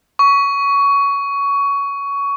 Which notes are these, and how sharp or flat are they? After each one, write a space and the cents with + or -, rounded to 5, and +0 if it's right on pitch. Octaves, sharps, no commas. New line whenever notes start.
C#6 +20